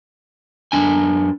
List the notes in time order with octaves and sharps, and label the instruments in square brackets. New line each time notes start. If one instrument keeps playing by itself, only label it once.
[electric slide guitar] F#2 C3 D4 G#5